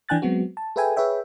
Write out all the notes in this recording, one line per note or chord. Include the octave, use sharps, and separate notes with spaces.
E3 D4 G5 G#5 F#6 A6
F#3 G#3 B3 C4 F#4
A5
G#4 A4 B4 E5 G5 G#5
G#4 B4 C#5 E5 G5